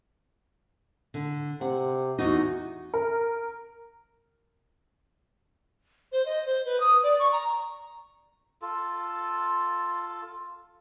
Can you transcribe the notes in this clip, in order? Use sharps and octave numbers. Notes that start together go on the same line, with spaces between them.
D3
C3 F#5
E2 D#4 F#4
A#4
C5
D#5
C5
B4
D#6
D5
C#6
A#5
F4 A4